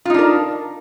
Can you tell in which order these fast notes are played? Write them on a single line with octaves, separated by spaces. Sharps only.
F4 D#4 D4 A#4